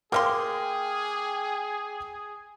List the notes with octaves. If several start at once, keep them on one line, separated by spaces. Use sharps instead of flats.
A#3 G#4 E5 G5 C6 D6 F6